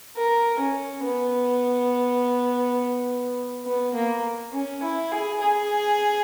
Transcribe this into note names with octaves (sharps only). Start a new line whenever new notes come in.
A#4
C#4
B3
B3
A#3
C#4
E4
G#4
G#4